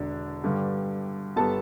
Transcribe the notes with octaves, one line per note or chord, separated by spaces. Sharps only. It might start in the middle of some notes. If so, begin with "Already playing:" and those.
Already playing: E1 E2 D3 D4
G2 D3 G3
G1 G3 B3 A4 A5